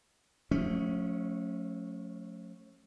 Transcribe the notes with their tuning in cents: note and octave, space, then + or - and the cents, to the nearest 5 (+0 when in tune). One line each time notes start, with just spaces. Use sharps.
F3 +40 A3 +0 C#4 +0